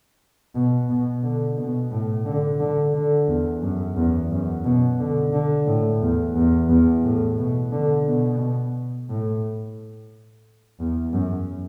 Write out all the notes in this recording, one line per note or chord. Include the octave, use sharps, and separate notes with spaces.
B2
B2
D3
B2
A2
D3
D3
D3
E2
F#2
E2
F#2
B2
D3
D3
A2
E2
E2
E2
A2
B2
D3
B2
A2
E2
F#2